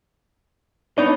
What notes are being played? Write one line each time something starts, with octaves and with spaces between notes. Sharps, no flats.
B3 D4 D#4 C#5 D#5